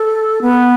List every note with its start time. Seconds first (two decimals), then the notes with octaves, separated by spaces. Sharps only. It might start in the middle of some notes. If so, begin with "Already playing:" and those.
Already playing: A4
0.42 B3